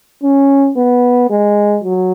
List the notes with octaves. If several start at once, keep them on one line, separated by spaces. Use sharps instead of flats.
C#4
B3
G#3
F#3